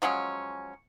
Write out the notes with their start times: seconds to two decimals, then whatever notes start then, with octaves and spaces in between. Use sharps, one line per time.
0.02 F3 F#3 G#3 C#4